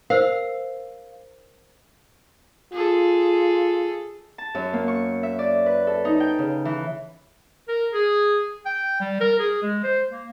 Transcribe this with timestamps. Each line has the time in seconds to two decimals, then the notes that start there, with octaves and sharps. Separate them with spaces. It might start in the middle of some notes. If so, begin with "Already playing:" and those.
0.10 A#4 C5 F5 E6
2.73 F4 G#4 A4
4.38 A5
4.55 F#2
4.73 A#3
4.88 C#6
5.23 E5
5.39 D5
5.66 B4
5.87 A4
6.05 D#4
6.20 G5
6.39 C#3
6.65 E3
7.68 A#4
7.93 G#4
8.66 G5
9.00 G3
9.21 A#4
9.40 G#4
9.63 G#3
9.83 C5
10.11 A#3